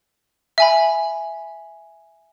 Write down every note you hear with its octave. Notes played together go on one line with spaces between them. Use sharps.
E5 G#5 B5